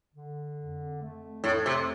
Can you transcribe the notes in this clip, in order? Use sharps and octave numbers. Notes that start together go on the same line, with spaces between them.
D3
F2
A3
F2 A2
C3